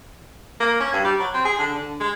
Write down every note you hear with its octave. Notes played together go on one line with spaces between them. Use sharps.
A#3
C#4
G2
G3
F#3
C4
G#4
D3
D3
G#3